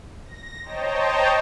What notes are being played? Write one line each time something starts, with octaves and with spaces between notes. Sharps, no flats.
A#6
C5 C#5 D#5 G5 A5 A#5